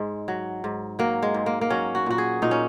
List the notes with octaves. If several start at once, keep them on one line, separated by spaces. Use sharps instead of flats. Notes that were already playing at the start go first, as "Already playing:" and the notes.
Already playing: G#2 G#3
F#3
G#2
F#3 A#3
G#3
G#2
A#3
A#3
F#3 C#4
F#4
A#2 F#4
G#4
A#2 D#4
C#4